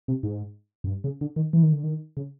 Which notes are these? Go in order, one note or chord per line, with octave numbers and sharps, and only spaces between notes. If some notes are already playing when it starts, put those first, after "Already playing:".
C3
G#2
F#2
G2
C#3
D3
D#3
E3
D#3
D3
D#3
C#3